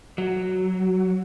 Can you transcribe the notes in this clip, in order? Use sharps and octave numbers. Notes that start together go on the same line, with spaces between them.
F#3